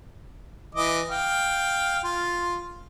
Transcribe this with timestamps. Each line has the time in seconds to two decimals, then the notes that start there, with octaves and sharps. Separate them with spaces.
0.75 E3 D#5 D6
1.10 F5 G5
2.04 F4